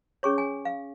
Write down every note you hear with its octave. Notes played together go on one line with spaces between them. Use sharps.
C#4 G#4 C#5 C#6
G#5
F5